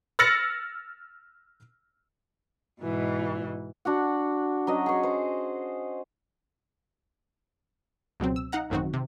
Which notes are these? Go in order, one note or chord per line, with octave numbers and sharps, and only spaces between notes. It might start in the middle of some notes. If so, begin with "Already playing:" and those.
E6 F6 A6 A#6 C#7 F#7
G#2 B2 E3
D4 F#4 F#5
F#3 C#4 D#5
G#4 C#5
C5
C#2 B2 F#3 C4
E6
D#4 F5 F#5 A#5
A1 F#2 D#3 C4 D#4 F#4
C3